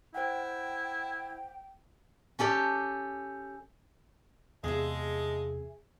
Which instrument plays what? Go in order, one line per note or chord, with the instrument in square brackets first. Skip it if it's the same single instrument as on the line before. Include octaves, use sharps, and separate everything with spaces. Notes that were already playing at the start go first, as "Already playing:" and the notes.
[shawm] E4 [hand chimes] C5 F#5 [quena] G5
[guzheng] C#4 G4 A4 D5
[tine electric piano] E2 C3 [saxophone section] F3 G#3 [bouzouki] G#4 E5